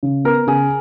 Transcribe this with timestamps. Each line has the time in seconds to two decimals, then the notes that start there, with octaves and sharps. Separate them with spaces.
0.03 C#3
0.25 B3 A#4
0.47 C#3 G#4